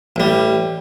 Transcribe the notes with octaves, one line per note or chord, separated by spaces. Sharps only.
A1 G3